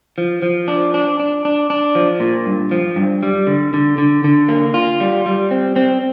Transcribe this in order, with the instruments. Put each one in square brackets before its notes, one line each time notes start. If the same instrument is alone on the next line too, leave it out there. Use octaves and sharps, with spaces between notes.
[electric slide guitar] F3
F3
D4
D4
D4
D4
D4
F3
A#2
G2
F3
G2
G3
D3
D3
D3
D3
A#3
F4
G3
G3
C4
C4